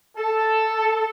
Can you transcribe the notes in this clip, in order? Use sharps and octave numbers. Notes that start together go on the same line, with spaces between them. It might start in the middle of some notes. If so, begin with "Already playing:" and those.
A4